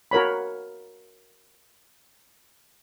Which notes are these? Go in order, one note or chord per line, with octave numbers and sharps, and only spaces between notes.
F#4 A#4 C#5 B5